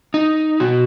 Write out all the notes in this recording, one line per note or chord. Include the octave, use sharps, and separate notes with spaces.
D#4
B2 F#4